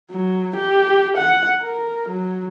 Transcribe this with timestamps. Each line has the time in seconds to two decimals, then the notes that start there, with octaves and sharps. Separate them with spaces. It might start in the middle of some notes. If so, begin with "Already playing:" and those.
0.12 F#3
0.56 G4
1.17 F#5
1.62 A#4
2.09 F#3